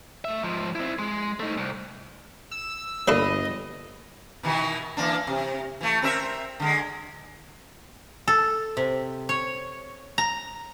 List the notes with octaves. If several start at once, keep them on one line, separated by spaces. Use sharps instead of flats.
A3 E5
G#2 F3
C4 E4
G#3
A3 D#4
C2
E6
G1 A#3 D4 A4 C#5 D#5 E5 B5
B2 D#3 E3
E3 A#3 D4
C3
E3 A3
C4 A#4 E5
D3 G#3
A4
C3
C#5
A#5